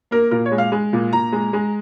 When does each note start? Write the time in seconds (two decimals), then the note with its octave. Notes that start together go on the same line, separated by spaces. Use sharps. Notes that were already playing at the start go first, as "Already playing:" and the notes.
0.11 A#3 A#4
0.31 A#2 A#4
0.46 C#5
0.52 G#3
0.58 F5
0.72 G#3
0.93 A#2
1.13 A#2 A#5
1.32 G#3
1.53 G#3